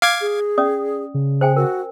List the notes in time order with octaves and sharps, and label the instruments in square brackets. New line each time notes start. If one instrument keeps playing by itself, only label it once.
[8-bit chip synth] F5 D6 G#6
[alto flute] G#4
[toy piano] C#4 D5 D#6
[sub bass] C#3
[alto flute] G#4 [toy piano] C5 G5 G#5
[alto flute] F#4 [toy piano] A#4